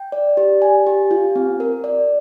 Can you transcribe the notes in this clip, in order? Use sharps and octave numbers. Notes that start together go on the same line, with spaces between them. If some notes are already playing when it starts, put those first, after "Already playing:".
Already playing: G5
D5
G4
G#5
G4
F4
C4
A#4
D5